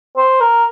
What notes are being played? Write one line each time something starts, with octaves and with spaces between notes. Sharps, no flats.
C5
A#4